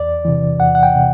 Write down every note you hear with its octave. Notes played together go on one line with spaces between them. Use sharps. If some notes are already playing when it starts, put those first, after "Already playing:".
Already playing: E2 D5
C3 E3
E2 F#5
F#5
G5
C3